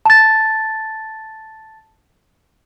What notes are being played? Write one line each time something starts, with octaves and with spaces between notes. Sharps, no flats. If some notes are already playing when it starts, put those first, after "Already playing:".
A5 A6